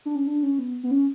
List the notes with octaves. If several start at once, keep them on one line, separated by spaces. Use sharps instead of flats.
D4
C#4
D4
C#4
B3
B3
C#4